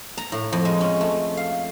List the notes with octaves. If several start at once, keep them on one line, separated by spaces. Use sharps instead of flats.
A#5
A2
F2
G#3
C#4
A3
F5